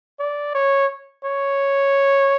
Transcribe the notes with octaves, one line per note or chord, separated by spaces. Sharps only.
D5
C#5
C#5